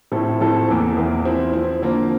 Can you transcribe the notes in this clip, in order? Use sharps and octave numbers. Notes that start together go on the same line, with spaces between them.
A2 F3 C4 E4 A4
A2 F3 C4 E4 A4
E2 E3 A#3
E2 E3 A#3
F3 C4 E4
F3 C4 E4
D3 F3 A#3